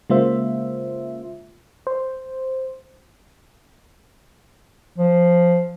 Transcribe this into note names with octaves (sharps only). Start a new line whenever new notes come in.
C#3 G#3 A#3 F4 C5 E5
C5
F3